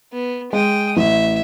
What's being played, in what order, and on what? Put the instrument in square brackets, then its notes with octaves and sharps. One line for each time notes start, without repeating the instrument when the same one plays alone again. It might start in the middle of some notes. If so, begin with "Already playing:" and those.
[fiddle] B3
[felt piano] G#3 [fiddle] G5 D#6
[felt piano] A1 [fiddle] E5